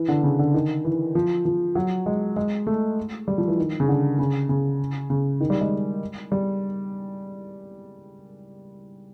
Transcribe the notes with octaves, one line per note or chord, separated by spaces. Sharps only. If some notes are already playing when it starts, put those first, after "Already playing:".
Already playing: E3
D3
C#3
D3
D#3
E3
F3
F3
F#3
G#3
G#3
A3
G3
F3
E3
D#3
C#3
D3
C#3
C#3
C#3
D#3
G3
G#3
G3